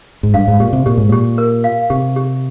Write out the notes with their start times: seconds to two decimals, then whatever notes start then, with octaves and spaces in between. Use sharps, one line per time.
0.23 G#2
0.34 G2 F5
0.48 G#2
0.60 A#2 G4
0.73 C3
0.86 A#2 G4
0.98 G#2
1.09 A#2 G4
1.38 A#4
1.64 F5
1.90 C3 G4
2.16 G4